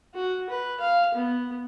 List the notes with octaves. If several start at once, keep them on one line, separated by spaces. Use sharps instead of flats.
F#4
B4
F5
B3